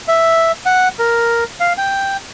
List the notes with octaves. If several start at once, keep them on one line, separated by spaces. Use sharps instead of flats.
E5
F#5
A#4
F5
G5